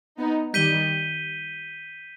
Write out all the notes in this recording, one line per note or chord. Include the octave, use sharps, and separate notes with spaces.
B3 D#4
D#3 G3 G6 B6 D#7 G7